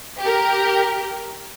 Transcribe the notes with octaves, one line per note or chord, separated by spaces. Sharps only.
G4 A#4